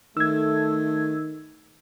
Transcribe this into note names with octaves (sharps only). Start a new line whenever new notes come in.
D#3 A3 E6 G#6